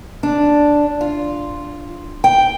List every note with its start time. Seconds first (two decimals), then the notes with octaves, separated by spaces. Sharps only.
0.23 D4
1.01 F4
2.24 G5